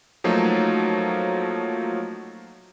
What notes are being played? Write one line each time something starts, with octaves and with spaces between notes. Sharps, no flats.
F3 F#3 A3 A#3 D#4